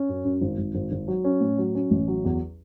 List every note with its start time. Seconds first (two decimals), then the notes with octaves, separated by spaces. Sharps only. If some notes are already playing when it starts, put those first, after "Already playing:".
Already playing: C#4
0.09 F#2
0.24 F#2
0.41 G#1
0.58 G#1
0.75 G#1
0.92 G#1
1.08 F#3
1.24 C#4
1.41 A2
1.58 F#3
1.75 C#4
1.91 A1
2.08 F#3
2.24 E2